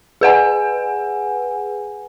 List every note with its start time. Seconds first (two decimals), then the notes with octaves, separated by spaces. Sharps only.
0.21 G#4 B4 F#5 G#5